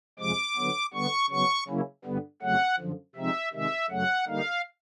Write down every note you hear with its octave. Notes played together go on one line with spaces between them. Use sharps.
F2 C3 F3 G#3 D6
D3 F#3 B3
D3 G3 B3 C#6
C#3 F#3 B3 C#6
C#3 F#3 A#3 C#4 E4
G2 D3 G3 B3
F2 C#3 F#3 A3 F#5
F#2 D3 F3
C3 F3 G#3 C4 D#4 E5
C3 D#3 G#3 E5
F#2 C#3 F#3 A3 F#5
D3 G3 A#3 D#4 F5